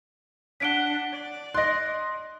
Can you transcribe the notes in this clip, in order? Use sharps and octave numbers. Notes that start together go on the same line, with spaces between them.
D4 F#5 B6 D7 G7
D5
D#5 C6 F#6 A#6